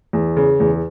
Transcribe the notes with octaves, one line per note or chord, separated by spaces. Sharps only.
E2
C#3
E2